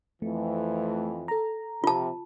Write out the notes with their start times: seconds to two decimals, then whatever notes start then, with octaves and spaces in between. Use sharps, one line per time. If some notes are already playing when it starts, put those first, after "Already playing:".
0.22 F2 E3 A3
1.28 A4 A#5
1.84 C3 F3 F4 A5